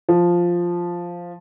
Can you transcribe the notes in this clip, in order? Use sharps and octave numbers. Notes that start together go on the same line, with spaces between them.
F3